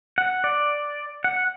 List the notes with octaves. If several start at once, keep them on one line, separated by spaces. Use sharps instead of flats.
F#5
D5
F#5